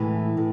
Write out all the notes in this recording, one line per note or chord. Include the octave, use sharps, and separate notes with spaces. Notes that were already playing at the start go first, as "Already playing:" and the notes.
Already playing: A2 E3 G#3
A2